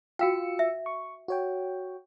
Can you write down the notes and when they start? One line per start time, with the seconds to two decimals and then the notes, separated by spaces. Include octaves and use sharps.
0.19 F4 F#4 F5 G5 E6 C#7
0.59 E5
0.86 C#6
1.28 F#4 C#5 G5